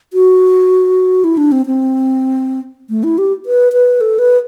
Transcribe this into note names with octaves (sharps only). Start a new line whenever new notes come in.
F#4
E4
D4
C4
C4
A3
E4
G4
B4
B4
A4
B4